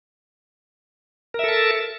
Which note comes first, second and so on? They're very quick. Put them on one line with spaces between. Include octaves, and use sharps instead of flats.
A#4 E5 A4 A5